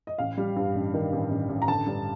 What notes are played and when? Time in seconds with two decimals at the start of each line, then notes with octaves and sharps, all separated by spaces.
0.07 D#5
0.18 A1 F5
0.38 G3
0.56 G2
0.75 A1
0.94 D#3
1.12 A1
1.30 A1
1.49 A1
1.62 A#5
1.68 D3 A5
1.86 G2